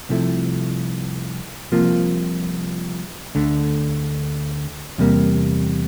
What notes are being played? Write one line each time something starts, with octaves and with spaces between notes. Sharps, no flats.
C2 C3 F3 A3 E4
C2 C3 F3 A#3 F4
D2 D3 A3
E2 C3 G3 A#3